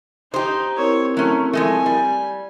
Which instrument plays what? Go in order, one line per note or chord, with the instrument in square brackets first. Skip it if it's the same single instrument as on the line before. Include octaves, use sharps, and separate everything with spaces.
[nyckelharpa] D#4 [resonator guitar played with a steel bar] G4 C5 [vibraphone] D#6
[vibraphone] C4 E4 A#4 [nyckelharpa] C#5
[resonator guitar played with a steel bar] F#3 C#4 [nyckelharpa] A3
[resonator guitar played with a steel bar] F3 G#3 A3 [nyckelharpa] G#5
[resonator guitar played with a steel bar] G3